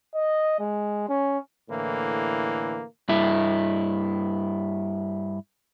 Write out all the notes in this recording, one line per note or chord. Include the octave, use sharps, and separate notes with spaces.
D#5
G#3
C#4
A2 D3 E3 A#3
G2 E4